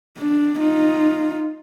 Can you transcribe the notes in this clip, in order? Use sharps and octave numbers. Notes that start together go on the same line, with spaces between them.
D4
D#4 F4